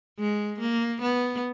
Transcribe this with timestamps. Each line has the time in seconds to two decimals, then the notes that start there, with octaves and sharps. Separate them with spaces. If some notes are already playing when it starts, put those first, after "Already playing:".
0.19 G#3
0.61 A#3
1.02 B3